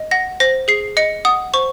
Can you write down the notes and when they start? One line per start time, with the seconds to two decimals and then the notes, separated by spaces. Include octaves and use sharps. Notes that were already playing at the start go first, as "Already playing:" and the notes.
Already playing: D#5
0.11 F#5 A#6
0.40 C5 A#6
0.68 G#4 C7
0.97 D#5 C#7
1.25 F#5 D#6
1.54 C5 C#6